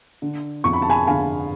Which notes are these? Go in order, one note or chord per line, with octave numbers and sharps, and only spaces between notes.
D3
F2 C#6
B5
A5
G#5 B5
D3 F5 G#5